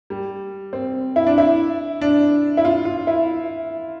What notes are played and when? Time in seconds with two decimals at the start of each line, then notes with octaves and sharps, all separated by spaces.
0.10 G3
0.73 C4
1.16 E4
1.27 D4
1.38 E4
2.01 D4
2.57 E4
2.65 F4
2.85 F4
3.07 E4